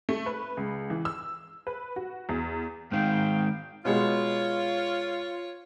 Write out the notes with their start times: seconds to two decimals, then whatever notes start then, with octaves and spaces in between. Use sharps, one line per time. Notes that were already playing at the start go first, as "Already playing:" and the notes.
0.09 A3
0.26 B4
0.57 C#2
0.90 E3
1.05 E6
1.67 B4
1.96 F#4
2.29 E2
2.92 G#2 D#3 F5 G5
3.85 B2 G#3 F4 C#5